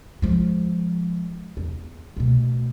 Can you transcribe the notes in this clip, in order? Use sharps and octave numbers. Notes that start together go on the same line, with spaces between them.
F3 G#3
E2
B2 A3